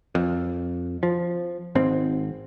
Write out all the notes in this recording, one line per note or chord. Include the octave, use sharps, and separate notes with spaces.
F2
F3
G#1 G#2 C4